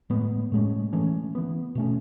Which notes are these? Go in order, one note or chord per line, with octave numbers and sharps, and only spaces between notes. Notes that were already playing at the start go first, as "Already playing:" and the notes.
A2 G#3 B3
A2 G#3 C#4
E3 A3 C#4
E3 B3
B2 A3 C#4